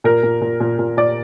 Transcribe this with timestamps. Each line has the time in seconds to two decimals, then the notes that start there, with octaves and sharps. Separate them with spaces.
0.04 A#2 A#4
0.23 A#2
0.41 A#2
0.60 A#2
0.79 A#2
0.97 A#2 D5